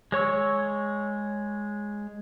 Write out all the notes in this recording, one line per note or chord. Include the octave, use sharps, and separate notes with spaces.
G#3 C#5 C#6 E6